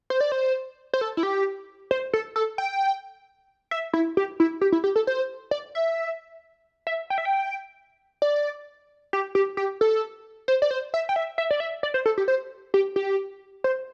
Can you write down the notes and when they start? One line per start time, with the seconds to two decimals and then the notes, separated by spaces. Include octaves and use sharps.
0.10 C5
0.21 D5
0.32 C5
0.94 C5
1.01 A4
1.17 E4
1.23 G4
1.91 C5
2.13 A4
2.36 A4
2.58 G5
3.71 E5
3.93 E4
4.17 G4
4.40 E4
4.61 G4
4.72 E4
4.84 G4
4.96 A4
5.07 C5
5.51 D5
5.75 E5
6.87 E5
7.10 G5
7.18 E5
7.25 G5
8.22 D5
9.13 G4
9.35 G4
9.57 G4
9.81 A4
10.48 C5
10.62 D5
10.71 C5
10.94 E5
11.09 G5
11.16 E5
11.38 E5
11.51 D5
11.60 E5
11.83 D5
11.94 C5
12.06 A4
12.18 G4
12.28 C5
12.74 G4
12.96 G4
13.64 C5